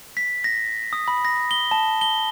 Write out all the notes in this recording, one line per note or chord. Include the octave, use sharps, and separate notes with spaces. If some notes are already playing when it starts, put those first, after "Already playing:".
B6
A#6
D#6
B5
A#6
G7
A5
G7